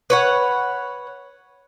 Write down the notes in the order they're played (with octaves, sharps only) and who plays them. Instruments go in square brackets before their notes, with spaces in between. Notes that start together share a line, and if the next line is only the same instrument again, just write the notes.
[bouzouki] B4 C#5 F#5